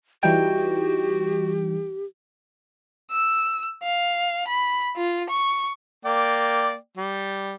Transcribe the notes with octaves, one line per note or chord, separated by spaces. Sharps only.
E3 G3 D#4 F#4 G4 G5
E6
F5
B5
F4
C#6
A#3 D5 G5
G3